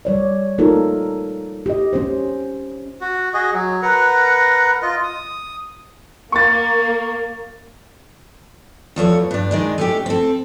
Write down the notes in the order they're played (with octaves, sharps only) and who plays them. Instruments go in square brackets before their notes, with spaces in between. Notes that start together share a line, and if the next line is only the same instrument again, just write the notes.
[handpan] G3 C#5 D5
A#3 D#4 F4 A4 A#4
G4 D#5
C#4 G4 C5
[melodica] F#4
F#4 G#4 D#5
F#3
A#4 B4 F#5 A#5
F4 D#5
D#6
[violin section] A#3 [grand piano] C#6 A6
[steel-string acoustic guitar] E2 F3 A3 C#5
G2 D4
D#3 G#3 D4
A3 C#4 G4
C4 A4